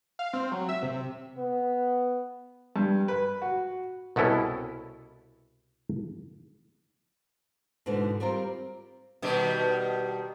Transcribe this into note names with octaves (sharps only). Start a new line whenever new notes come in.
F5
C4
F#3
E5
C3
B3
G2
B4
F#4
C2 B2 C#4 E4 A4
G#2 B2 D3 E3 B3
G3 C4 F4 A#4
B2 D#3 G3